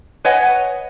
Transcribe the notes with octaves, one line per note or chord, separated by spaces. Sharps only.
B4 C#5 D#5 F#5 G#5